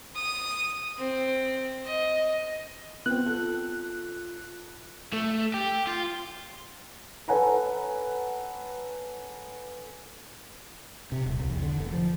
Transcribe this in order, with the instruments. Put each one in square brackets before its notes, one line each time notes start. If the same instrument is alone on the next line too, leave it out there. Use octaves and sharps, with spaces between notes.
[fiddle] D#6
C4
D#5
[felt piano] B3 C4 [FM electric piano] F#6
[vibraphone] F4 [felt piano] A4
[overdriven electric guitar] A3
G4
F4
[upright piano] A4 B4 C#5 F#5 G#5 A#5
[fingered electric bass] C3
D#1
C2
E2
D3
F1
F3